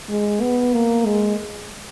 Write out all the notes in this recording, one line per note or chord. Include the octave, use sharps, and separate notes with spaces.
G#3
B3
A#3
G#3